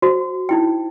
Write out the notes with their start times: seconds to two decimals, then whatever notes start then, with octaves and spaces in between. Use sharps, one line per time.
0.02 F#4 C5
0.49 D#4 E4 G5